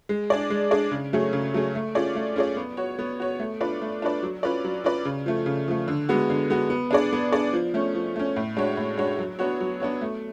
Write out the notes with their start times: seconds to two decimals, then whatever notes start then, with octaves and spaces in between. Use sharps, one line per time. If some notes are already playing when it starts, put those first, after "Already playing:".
0.09 G#3
0.30 D4 G#4 D5
0.50 G#3
0.71 D4 G#4 D5
0.91 C#3
1.13 F#3 A3 C#4 G#4
1.33 C#3
1.54 F#3 A3 C#4 G#4
1.75 A3
1.95 C#4 F4 G#4 D5
2.15 A3
2.36 C#4 F4 G#4 D5
2.57 B3
2.77 F#4 C#5
2.99 B3
3.20 F#4 C#5
3.39 A3
3.61 D4 F4 B4 D5
3.82 A3
4.02 D4 F4 B4 D5
4.23 F#3
4.43 C#4 F4 B4 D5
4.64 F#3
4.84 C#4 F4 B4 D5
5.05 C#3
5.26 F3 A3
5.46 C#3
5.68 F3 A3
5.88 D3
6.09 G#3 B3 F#4
6.30 D3
6.50 G#3 B3 F#4
6.70 B3
6.91 D4 G#4 D5
7.13 B3
7.32 D4 G#4 D5
7.53 F3
7.74 A3 C#4
7.95 F3
8.16 A3 C#4
8.36 A2
8.57 G#3 D4 F#4 C#5
8.77 A2
8.97 G#3 D4 F#4 C#5
9.18 F#3
9.39 B3 D4 F#4 C#5
9.60 F#3
9.80 B3 D4 F#4 C#5
10.01 A3